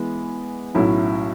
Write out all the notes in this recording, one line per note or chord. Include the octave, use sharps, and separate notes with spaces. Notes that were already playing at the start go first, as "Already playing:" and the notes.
Already playing: E3 G#3 B3
B1 A2 F#3 C#4 E4